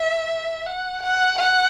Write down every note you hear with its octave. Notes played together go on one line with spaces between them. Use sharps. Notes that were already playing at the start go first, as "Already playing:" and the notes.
Already playing: E5
F#5
F#5
F#5